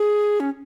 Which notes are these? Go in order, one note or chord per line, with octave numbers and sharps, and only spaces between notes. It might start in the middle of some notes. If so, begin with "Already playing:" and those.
Already playing: G#4
C#4